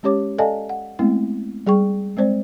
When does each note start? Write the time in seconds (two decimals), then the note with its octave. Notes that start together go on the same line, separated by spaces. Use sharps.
0.03 G#3 C#4 G4 C#5 D6
0.38 A4 D5 D#5 F5 G#5 A5
0.69 F#5
0.99 G#3 A3 B3 C4 E4
1.66 G3 G#4 G5 C#6
2.17 G#3 C4 C5 D5